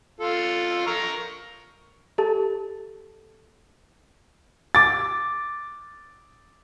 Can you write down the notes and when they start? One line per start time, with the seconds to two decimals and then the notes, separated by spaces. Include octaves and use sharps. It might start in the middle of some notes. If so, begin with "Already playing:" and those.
0.21 F4 A4
0.87 A#4 A#5 C#6
2.18 G4 A4 A5 A6
4.75 D6 A6